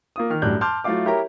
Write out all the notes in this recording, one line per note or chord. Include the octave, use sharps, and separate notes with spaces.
A#3 F4 D#6
D#3 F6
F#2 A2 G3 D4 F#6 G6
A5 C6 D6 F6 G6
F#3 A3 E4 F4 F5 D6
E4 G4 A#4 C#5 A#5